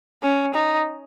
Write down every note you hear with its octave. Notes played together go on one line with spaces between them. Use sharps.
C#4
D#4